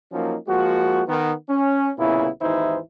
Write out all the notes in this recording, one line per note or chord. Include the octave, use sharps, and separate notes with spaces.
F3 F#3 A#3 C#4 D#4
F3 G#3 A#3 F#4
D#3 B3
C#4
C2 A#2 C#3 B3 E4
G#1 D#2 E3 D#4 E4 C5